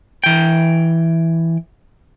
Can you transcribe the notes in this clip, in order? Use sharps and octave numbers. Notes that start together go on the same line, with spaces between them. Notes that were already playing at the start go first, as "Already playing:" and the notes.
E3 G5